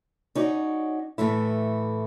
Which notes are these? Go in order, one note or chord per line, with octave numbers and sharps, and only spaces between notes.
C#4 D#4 F#4 D5
A2 E3 A3 E4